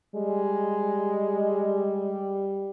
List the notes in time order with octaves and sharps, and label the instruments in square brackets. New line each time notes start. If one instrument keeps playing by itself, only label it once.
[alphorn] G3 [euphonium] G#3